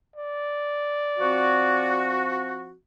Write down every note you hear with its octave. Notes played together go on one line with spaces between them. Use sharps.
D5
F3 C4 F#4